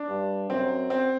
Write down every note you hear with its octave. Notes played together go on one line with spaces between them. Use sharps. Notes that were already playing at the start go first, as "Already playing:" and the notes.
Already playing: D4
G2
F#2 C4
C4